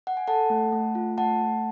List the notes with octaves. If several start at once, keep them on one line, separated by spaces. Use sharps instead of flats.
F#5
G#5
A4 F#5 A5
A3
A3
F4
A3 F#5 A5
A3